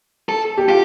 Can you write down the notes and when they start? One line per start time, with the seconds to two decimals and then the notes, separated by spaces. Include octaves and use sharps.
0.29 A4
0.58 G4
0.69 F4 G4